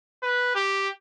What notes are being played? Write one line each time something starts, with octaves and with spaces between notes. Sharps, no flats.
B4
G4